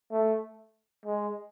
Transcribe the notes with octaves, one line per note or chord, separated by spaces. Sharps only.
A3
G#3